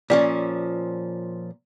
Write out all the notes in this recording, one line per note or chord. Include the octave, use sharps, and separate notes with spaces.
A#2 F3 C#4 D5